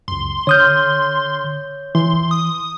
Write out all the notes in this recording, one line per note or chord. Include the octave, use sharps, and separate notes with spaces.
C#2 F#2 C6
D3 C#5 D#6 F6 G6
E3 C6
D#6